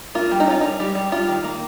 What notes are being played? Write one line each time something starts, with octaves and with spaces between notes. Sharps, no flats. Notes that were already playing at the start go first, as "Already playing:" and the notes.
A#3 F4
G3
D#4
C#4 F4
G3 D#4
G3
G3
G3 F4
D#3
A#3